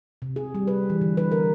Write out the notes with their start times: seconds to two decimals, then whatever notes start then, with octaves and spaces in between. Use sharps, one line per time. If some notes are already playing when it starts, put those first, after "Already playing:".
0.22 C3
0.36 G#4
0.55 G3
0.68 B4
0.90 E3
1.01 D3
1.17 B4
1.32 A#4